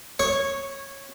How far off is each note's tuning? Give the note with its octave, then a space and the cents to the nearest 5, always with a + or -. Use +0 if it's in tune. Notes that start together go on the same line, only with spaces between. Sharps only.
C#5 -15 C#6 +0